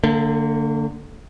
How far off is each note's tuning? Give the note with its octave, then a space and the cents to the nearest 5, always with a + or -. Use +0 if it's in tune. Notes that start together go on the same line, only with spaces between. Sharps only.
D3 +0 A#3 -40